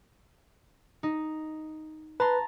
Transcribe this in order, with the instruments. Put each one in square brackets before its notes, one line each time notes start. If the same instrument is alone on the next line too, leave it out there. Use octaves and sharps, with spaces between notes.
[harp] D#4
[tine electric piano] B4 [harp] A5 A#5 C6